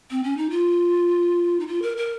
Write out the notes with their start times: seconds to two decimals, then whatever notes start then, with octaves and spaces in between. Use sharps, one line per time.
0.11 C4
0.24 C#4
0.37 D#4
0.50 F4
1.60 D#4
1.67 F4
1.82 A#4
1.97 A#4